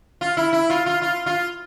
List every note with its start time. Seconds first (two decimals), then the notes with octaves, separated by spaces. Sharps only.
0.21 F4
0.37 E4
0.53 E4
0.70 F4
0.86 F4
1.02 F4
1.26 F4